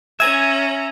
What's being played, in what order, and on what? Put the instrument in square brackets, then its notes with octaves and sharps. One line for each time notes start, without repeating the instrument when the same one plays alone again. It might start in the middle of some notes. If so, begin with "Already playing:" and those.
[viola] C#4 A#5 [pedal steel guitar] E5 G#5 [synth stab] G#6